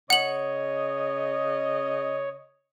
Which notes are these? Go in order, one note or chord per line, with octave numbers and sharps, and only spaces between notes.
C#3 C#5 D#5 F#5 F#7